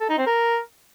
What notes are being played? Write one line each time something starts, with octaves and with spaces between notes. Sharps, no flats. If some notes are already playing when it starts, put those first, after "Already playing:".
A4
D#4
C4
A#4